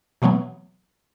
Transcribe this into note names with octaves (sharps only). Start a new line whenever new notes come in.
B2 E3 F#3 A3 B3